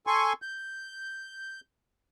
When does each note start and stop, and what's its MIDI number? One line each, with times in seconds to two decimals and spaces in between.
0.07 0.33 69
0.07 0.33 80
0.07 0.33 84
0.07 0.33 85
0.42 1.61 91